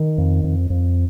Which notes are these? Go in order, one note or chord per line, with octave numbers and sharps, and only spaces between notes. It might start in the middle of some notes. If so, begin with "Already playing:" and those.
Already playing: D#3
F2
F2
F2